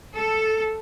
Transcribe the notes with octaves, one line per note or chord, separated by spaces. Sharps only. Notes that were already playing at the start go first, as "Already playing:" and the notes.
A4